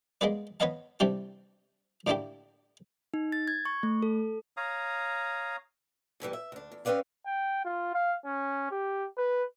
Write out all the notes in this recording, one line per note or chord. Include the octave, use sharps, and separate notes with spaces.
G#3 A#3 B3 G#4 B4 D5
B3 B4 C#5 D#5 F5 A5
C3 E3 G3 D4 G4
A2 D3 A#3 D4 E4 G4
D#4
A6
G#6
C#6
A3
A4
C#5 F5 A#5 D#6
G#2 B2 E3 G3
E5
D2 D4
E2
G3 C4 C#4 B4 D5 F5
G5
F4
F5
C#4
G4
B4